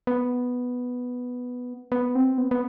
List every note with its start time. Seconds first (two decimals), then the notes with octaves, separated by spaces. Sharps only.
0.07 B3
1.92 B3
2.15 C4
2.38 B3
2.51 B3